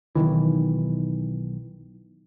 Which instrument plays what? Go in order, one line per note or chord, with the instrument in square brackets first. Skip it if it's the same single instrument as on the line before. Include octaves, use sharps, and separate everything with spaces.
[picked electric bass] B1 C3 D#3 E3